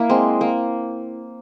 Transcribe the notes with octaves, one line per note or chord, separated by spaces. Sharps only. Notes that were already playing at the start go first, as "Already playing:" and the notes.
Already playing: A#3 E4
G#3 C4
A#3